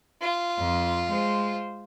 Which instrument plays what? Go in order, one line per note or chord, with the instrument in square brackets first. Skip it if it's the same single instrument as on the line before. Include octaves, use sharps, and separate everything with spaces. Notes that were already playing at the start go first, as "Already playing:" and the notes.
[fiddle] F4
[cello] F2
G#3 C5